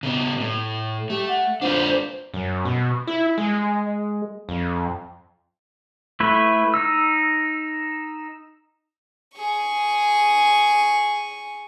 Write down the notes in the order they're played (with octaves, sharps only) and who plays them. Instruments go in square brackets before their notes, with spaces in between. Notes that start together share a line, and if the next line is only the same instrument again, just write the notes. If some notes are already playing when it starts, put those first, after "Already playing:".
[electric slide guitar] C#3 B3
A2
[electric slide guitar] A3 [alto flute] G4
[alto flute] F#5
[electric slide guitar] D4 F4 B4 [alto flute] C5
[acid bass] F#2
B2
E4
G#3
F2
[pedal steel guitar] A3 E4 B4 E5
D#4 E6
[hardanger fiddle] G#4 C#6